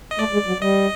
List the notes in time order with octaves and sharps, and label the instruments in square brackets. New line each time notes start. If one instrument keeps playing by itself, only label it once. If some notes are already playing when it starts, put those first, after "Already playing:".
[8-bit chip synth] D#5
[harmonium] A3 [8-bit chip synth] D5
[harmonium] G#3
F#3
[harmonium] G3 [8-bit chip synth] D#5